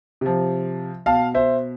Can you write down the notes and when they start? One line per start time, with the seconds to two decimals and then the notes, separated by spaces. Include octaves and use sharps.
0.21 C3 F3
1.06 B2 F5 A5
1.34 C5 E5